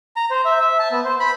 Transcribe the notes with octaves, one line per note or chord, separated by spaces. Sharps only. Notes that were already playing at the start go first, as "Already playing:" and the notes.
A#5
C5
E5
E5
A5
B3
C5
B5